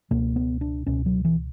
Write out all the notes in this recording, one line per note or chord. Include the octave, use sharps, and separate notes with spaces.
C#2 B2 A#3
B3
D4
C#2 B2 C#4
F#3
E3